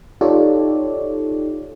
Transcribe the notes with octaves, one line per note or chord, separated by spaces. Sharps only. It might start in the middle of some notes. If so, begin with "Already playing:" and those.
D#4 F4 G4 A4 C#5 D5